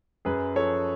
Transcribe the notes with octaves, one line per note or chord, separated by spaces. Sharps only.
F#2 G#4 B4
F3 A4 C#5